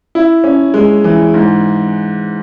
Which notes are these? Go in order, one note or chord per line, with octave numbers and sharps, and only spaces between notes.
E4
C#4
G#3
E3
G#2